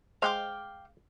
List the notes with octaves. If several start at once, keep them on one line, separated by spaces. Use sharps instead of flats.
G#3 C5 F5 G5 D6